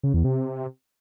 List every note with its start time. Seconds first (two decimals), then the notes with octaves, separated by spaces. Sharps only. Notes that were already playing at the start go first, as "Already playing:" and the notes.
0.03 C#3
0.14 E2
0.24 C3